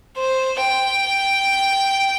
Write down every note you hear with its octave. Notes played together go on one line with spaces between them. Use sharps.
C5
G5